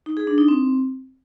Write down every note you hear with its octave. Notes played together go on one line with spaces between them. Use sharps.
D#4
G#4
D4
D#4
C4